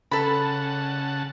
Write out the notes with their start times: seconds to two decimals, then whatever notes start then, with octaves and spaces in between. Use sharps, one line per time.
0.11 C#3 A4 F#5 A5 B5